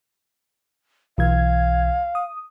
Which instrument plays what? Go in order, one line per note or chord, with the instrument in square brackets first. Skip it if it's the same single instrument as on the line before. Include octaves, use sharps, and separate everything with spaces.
[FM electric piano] B1 E3 G#6 [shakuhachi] F5
[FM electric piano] D#6